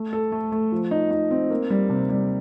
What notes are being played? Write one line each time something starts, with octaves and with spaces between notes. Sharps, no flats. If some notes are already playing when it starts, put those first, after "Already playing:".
Already playing: A3
A4
A3
A3
F3
D#4
D#4
C4
A#3
G3
C3
G3